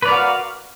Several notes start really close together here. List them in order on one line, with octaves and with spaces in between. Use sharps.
B4 D5 A#4 F#4 F5